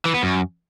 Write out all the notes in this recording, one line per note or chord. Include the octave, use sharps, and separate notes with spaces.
E3
B3
F#2